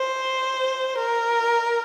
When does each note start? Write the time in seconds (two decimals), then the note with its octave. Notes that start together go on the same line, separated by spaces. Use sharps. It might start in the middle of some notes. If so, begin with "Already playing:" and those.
Already playing: C5
0.98 A#4